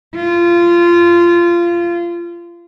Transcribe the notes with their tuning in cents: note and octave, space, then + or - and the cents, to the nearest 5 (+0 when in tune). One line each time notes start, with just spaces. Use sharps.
F4 -20